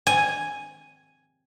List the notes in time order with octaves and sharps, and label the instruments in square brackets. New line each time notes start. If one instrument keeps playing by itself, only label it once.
[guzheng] G#5